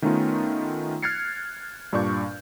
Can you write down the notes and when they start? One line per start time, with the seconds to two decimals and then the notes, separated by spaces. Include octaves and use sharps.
0.02 D#3 A3 B3 C#4 D#4 F4
1.02 F6 F#6 G#6 A6 C7 C#7
1.93 G2 A#2 D4 D5 C#6 G6